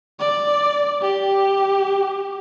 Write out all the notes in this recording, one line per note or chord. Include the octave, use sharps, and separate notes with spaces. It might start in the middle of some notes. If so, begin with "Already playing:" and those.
D5
G4